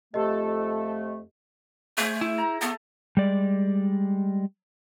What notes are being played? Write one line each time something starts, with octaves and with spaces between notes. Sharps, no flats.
F2 A3 G4 A4 D#5
A3 G#4 C5
E4
A#5
A3 B3 A5
G3 G#3 D5